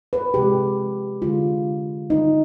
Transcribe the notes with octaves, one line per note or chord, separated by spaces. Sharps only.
B4
C3 F3 G#3 G4
D3 G#3 F4
D3 G3 D#4